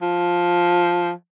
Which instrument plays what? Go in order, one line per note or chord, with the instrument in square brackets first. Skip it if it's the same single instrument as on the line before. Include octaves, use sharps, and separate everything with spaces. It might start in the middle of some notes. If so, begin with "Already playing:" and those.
[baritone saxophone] F3